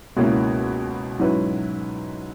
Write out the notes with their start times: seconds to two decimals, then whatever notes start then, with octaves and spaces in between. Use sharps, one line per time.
0.17 C#2 B2 A#3 C#4 E4
1.19 G#2 F#3 C#4 E4 B4